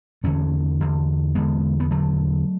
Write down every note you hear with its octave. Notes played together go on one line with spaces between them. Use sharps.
E2 D3 A3 C#4
E2 D3
E2 D3 G#3 B3
B3
E2 D3 F#3 A3